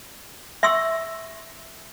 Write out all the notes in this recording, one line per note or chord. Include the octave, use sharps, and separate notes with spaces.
E5 C6 C#6 E6